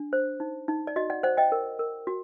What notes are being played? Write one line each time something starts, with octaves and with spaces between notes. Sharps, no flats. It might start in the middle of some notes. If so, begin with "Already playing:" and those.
Already playing: D4
C5
D#4
D#4
D5
F#4 D#5
D5 F#5
C5 D5 F#5
D#5 G5
A#4
A#4
F#4